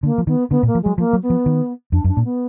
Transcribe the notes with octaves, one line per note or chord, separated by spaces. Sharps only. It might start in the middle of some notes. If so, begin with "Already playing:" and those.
D3 A#3
F3
D#3 B3
D3 B3
A#2
A#3
F3
F#3 G#3
F3 A#3
F#3
B3
F3
D#3
F2 D4
F#2
D4
A#2
B3